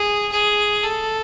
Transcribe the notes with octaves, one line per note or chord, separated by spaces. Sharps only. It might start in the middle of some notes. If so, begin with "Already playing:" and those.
Already playing: G#4
G#4
A4